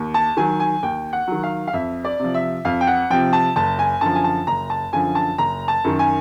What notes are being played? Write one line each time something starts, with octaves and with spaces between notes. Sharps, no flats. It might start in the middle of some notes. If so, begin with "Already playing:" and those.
Already playing: D#2
A5
D#3 F#3 G#5
G#5
D#2 G5
F#5
D#3 F#3
F5
F5
F2 E5
D5
C3 F3
E5
F2 F5
G5
F#5
C3 F3 G5
A5
F#1 A5
G#5
F#2 D3 F3 A5
G#5
A5
F#1 A#5
A5
F#2 D3 F3 G#5
A5
F#1 A#5
A5
F#2 D#3
G#5